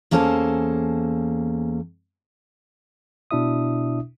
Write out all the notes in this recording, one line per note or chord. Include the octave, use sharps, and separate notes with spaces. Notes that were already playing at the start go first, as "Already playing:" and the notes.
E2 A#3 C#4 A4 C5 A5
B2 D4 E4 E5 D#6